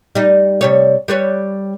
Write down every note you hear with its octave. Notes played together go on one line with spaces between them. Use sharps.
G3 D#4
C3 G3 C#5
G3 B4 C#5